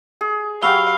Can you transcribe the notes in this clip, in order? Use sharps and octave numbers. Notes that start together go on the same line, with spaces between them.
G#4
F#3 F#4 G4 F5 B5 E6 G7